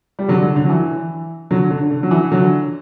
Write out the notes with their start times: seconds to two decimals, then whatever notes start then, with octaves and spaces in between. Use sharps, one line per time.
0.19 G3
0.28 D3 F#3
0.42 D3
0.56 D3
0.65 F#3
0.70 E3
1.51 D3 F#3
1.70 D3
1.91 D3
2.03 F#3
2.11 E3
2.31 D3 F#3